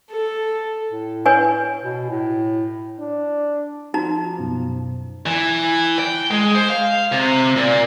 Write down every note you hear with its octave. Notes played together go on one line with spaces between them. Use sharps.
A4
A2
B4 C#5 G#5
B2
A2
D4
F3 D#4 F#4 A#5
F#2 B2
E3
G5
G#3
C5
F5
C3
A#2